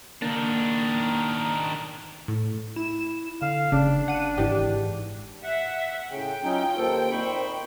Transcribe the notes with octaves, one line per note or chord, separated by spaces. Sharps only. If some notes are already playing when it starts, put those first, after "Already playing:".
D#3 A#3 D4
A2
E4 E7
D3 F5
F#1 C#3 D4
F#5 D#7
G#1 G#2 E3 G4
E5 F#5
A2 C#3 G5
F#3 C#4 D#4 F4
D#2 A#3 A4 C5
A#2 C4 D#4 C5 B5 C#6